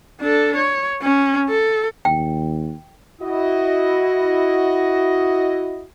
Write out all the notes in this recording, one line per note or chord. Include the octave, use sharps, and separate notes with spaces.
D4 A4
C#5
C#4
A4
D#2 G5
E4 F#4 D#5